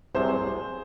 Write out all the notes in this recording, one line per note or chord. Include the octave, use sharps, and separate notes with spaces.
C2 C3 F#3 G#4 C5